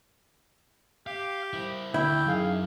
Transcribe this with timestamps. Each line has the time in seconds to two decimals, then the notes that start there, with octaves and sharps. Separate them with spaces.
1.07 G4 F5
1.53 E4 C5
1.94 D2 E4 G5
2.26 F#2 D#4 G#4 F5